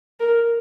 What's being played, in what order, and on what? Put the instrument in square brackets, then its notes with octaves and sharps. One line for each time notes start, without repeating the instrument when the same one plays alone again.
[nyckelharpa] A#4